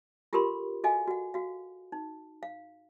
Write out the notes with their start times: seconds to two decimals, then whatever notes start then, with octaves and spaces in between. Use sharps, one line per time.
0.33 F4 G4 A4 A#4 B5 C6
0.84 F#4 A4 D#5 F5 G#5
1.07 F#4 F#5
1.34 F#4 F5
1.92 D#4
2.43 F5